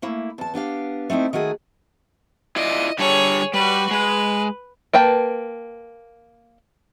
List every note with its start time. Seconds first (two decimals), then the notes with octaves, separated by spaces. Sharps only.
0.02 A3 A#3 E4
0.38 E2 A5
0.54 B3 D4 G4 F5
1.10 A3 C4 D#4 E4
1.33 D#3 A3 F#4 G#4
2.56 E4 F4 D5 D#5
2.99 D3 G3 G#4 A4 C#5
3.54 G3 F#4 B4
3.91 G#3 B4
4.94 A#3 B4 G5 A5